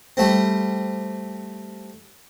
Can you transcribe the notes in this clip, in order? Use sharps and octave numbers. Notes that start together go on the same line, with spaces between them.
G3 A3 C4